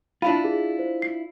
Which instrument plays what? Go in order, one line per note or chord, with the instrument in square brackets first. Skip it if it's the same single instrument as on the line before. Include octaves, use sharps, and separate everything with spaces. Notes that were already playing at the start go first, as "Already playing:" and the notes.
[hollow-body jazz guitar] D4 E4 F4 [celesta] B5 D#7
[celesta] G#4
C5
C7